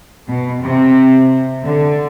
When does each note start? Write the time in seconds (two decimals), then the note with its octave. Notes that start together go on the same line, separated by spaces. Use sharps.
0.28 B2
0.62 C3
1.65 D3